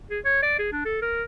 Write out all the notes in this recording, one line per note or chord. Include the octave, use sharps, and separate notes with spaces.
G#4
C#5
D5
G#4
D4
A4
A#4